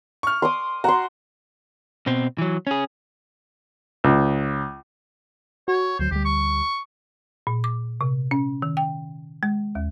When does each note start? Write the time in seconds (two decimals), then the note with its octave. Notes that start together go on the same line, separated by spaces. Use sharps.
0.23 C#6 F6
0.42 C6 D6 D#6
0.84 F#4 A#5 C6
2.07 B2 C4
2.38 E3 F#3
2.67 C#4 G#4
4.04 C#2
5.68 F#4 C#5
5.99 D2 F#3 C5
6.11 D2 G3 G4
6.25 C#6
7.47 A#2
7.64 D6
8.01 C3
8.31 C#4
8.62 D#3
8.77 G5
9.43 G#3
9.75 D#2